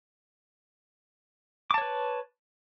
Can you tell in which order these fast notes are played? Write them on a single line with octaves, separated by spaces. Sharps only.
D6 A5 C#5 B4